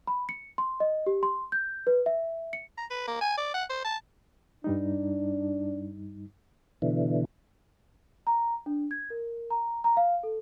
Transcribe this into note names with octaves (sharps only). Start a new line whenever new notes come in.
B5
C#7
C6
D#5
G4
C6
G6
B4
E5
C#7
A#5
B4
A#3
G#5
D5
F#5
C5
A5
G2 G3 D4 D#4
B2 D3 E3
A#5
D4
G#6
A#4
A#5
A#5
F5
A4